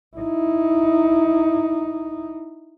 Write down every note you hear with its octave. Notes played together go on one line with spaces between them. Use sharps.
D#4 E4